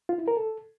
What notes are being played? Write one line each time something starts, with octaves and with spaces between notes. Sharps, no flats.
F4
E4
A#4
A4